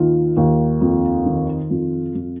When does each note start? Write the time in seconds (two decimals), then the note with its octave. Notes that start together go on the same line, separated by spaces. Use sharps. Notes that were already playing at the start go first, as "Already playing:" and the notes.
Already playing: D#2 D#3 F4
0.37 D#2
0.81 F2
1.26 D#3
1.70 F2
2.15 F2